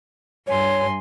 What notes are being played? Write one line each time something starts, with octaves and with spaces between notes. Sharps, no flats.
G2 C#5 G#5 C6